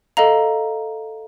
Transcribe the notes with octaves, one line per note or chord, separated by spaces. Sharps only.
A4 D#5 F5 A#5